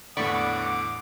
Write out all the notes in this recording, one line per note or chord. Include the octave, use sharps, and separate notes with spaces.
E2 A2 D3 D5 F#5 B5 C#6 D6